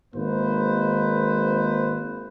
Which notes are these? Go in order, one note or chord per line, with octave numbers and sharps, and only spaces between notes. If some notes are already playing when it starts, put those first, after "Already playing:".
G#1 G#2 A#3 D#4 B4 C5